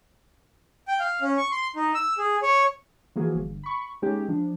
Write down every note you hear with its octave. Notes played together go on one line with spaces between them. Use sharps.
G5
F5
C#4
C#6
C6
D#4
E6
G#4
C#5
E3 F3 A#3 F#4 G#4
G1
B5 C#6
G#3 A#3 C#4 D#4 G4
F3 D4